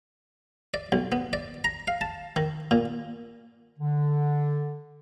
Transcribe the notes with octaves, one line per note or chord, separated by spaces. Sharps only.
D5
B1
B3
D5
A#5
F5
A5
D#3
A#2
D3